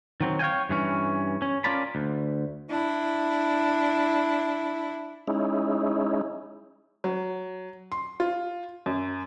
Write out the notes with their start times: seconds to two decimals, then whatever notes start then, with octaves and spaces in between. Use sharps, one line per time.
0.21 D#3 F#3 C4
0.39 C#5 F5 G5 G#5
0.69 G2 E3 C#4
1.42 C#4
1.64 C#4 F4 A#4 D5 A5 B5
1.95 D2
2.70 D4 E4
5.27 G#3 C#4 D#4 E4
7.04 F#3
7.92 C6
8.20 F4
8.86 F#2